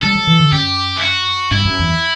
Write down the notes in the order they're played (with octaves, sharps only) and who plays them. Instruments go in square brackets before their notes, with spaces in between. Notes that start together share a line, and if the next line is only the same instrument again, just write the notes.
[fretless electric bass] G3 [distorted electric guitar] A4
[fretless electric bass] F#3
E3
D3
[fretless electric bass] F#2 [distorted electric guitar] G4
[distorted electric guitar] E4
F#4
[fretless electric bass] G2 [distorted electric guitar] E4
[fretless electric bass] F#2
E2